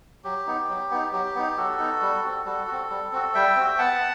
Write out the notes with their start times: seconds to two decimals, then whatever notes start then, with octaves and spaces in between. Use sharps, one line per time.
0.24 F#3 G4
0.47 B3 D#4
0.69 F#3
0.91 B3 D#4
1.12 F#3 G4
1.35 B3 D#4
1.57 F#3 F#4 A4
1.79 B3 D#4
2.01 G3
2.24 C4 F#4
2.46 G3 F#4 A4
2.67 C4 F#4
2.90 G3
3.12 C4 F#4
3.34 G3 E5 G5
3.56 C4 F#4
3.78 B3 F#5 A5